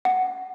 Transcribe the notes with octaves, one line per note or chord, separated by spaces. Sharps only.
F#5